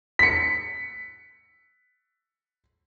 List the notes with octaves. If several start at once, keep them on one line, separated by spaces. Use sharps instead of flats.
B6 C#7